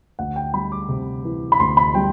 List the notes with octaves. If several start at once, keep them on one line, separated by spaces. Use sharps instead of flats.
D2 F#5
G5
G3 B5
D6
C3
E3
B5
D2 C6
B5
G3 G5